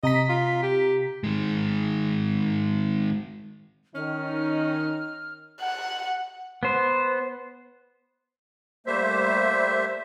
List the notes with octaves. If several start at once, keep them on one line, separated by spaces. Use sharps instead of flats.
C3 D#5 A#5 B6
F4
G4
D#3 G#3
D#3 C#4 D#4 F6
F#5
B3 C5
G3 A3 A#3 C5 E5